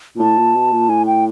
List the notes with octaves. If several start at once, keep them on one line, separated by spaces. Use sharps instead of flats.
A#2
A2 A5
A#2
B2
A#2
A2 G#5
G5